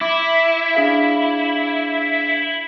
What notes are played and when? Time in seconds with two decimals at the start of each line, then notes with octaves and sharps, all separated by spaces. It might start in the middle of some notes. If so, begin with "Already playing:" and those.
0.01 E4 D6
0.75 D4 G#4 F5